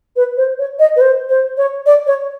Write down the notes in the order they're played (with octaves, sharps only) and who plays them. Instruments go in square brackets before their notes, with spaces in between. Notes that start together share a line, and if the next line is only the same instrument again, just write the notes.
[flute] B4
C5
C#5
D#5
B4
C5
C5
C#5
D5
C#5